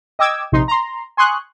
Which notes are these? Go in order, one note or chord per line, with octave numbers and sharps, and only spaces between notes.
D#5 G5 D6 E6 G#6
A#1 C3 D#4 C6
A#5 C6
G#5 C6 C#6 D#6 F#6